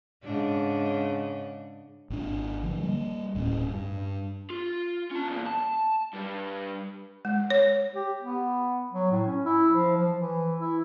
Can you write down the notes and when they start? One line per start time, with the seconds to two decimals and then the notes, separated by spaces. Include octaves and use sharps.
0.24 G#2 C#3 D4
2.10 G#1 D4
2.63 D3 F3
2.83 G3 A#3
3.35 D1 A2 C#4
3.69 G2
4.50 F4
5.11 C#4 A5
5.28 E2 A#2
5.46 A5
6.13 G2 G3
7.25 G#3
7.50 C#5
7.95 G4
8.21 B3
8.92 F#3
9.11 A2
9.27 C#4
9.45 E4
9.71 F3
9.97 F3
10.18 E3
10.60 E4